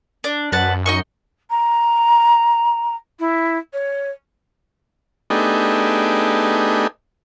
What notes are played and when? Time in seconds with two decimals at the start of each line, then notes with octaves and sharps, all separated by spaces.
0.24 D4
0.52 F#2 B4 F#5 A5
0.86 D#4 D#5 C#6
1.50 A#5
3.19 E4
3.73 C#5
5.30 A3 B3 D4 D#4 G4 G#4